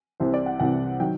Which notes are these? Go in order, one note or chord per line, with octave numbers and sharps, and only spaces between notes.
C2 C3 E3 C5
D5
F#5
C2 C3 E3 F#5
D#3 F#3 G5